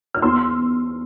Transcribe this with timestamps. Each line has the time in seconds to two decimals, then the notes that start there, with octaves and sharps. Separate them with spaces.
0.14 F6
0.22 E2 C6 E6